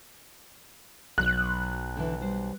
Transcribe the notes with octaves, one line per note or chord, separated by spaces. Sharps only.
B1 F#3 F#6
D3 E3
G3 C5